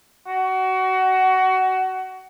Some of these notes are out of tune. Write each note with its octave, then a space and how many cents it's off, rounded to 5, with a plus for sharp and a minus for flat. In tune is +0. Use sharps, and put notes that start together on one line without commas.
F#4 +20